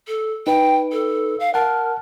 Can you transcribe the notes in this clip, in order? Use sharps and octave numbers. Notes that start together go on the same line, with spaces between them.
A4
D#4 B4 G5
A4
F5
A#4 F#5 A5